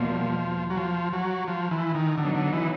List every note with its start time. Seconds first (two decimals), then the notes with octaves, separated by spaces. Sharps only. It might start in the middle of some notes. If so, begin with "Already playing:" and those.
Already playing: E2 B2 F3 G3 A#3
0.70 F#3
0.77 F3
1.13 F#3
1.48 F3
1.71 E3
1.95 D#3
2.17 D3 F#3 B3 D#4
2.35 D3
2.53 E3